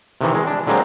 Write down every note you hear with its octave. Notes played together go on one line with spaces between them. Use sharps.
C3 D#3 E3
G#3
D4
D3 F#3 G#3 A#3 C4